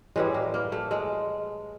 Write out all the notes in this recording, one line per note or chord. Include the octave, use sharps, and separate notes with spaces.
A2 E3 G3 G#3
A#3
A#3
A3
G#3